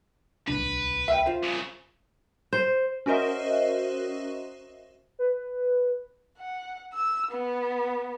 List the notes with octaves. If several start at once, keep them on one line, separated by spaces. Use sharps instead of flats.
D1 C2 D4 B4
E5 F5 G5
F4 C5
C2 C#3
C5
C#4 F#4 A#4 C5 D#5 E5
B4
F#5
E6
B3